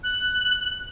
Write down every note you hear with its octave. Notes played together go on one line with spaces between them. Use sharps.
F#6